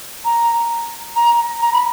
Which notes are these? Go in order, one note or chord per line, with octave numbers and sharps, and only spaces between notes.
A#5
A#5
A#5
B5